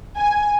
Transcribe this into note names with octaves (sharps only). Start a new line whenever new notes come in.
G#5